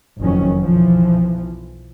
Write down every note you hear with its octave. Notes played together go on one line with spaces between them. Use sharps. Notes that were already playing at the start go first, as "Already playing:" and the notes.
F#1 F2 D#3 F#3 C#4
B1 E3 F3